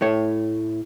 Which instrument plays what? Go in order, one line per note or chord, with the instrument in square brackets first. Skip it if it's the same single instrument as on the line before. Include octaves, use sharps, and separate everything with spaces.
[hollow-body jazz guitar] A2 A3 C#5